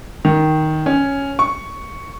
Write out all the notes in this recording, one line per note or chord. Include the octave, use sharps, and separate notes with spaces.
D#3
C#4
C#6